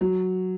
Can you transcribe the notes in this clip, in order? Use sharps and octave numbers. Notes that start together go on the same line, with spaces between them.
F#3